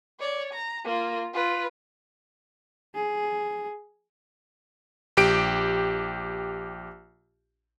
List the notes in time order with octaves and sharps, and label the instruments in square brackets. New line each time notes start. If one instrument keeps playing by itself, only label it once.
[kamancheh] C#5 D5
A#5
A#3 F4
F4 B4
[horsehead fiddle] G#4
[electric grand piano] A#1 G4 D7